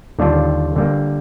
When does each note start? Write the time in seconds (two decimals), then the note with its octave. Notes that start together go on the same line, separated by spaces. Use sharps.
0.19 D#2 D3 G3 D4 F4
0.76 D3 G3 A#3